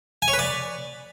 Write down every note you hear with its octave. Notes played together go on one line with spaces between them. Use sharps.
G#5
C#5
B4
D5